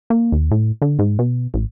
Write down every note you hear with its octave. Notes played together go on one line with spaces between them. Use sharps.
A#3
D#2
A2
D3
G#2
B2
A1